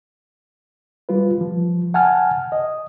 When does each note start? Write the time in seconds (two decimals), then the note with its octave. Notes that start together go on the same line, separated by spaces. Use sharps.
1.09 G3 F4 B4
1.41 F3
1.94 F#5 G#5 A5 F6
2.52 D#5